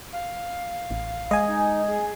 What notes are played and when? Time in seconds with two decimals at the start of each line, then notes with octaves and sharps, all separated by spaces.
0.13 F5
0.91 A1
1.31 G#3 D#5 G#5
1.48 D#4
1.87 G#4